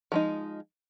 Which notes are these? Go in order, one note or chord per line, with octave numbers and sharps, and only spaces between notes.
F3 G#3 D#4